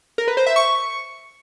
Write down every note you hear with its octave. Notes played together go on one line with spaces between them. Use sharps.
A#4
B4
C5
E5
C#6